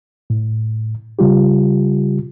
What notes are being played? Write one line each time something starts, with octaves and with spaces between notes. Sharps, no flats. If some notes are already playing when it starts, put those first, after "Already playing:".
A2
C#3 G3 F4 G4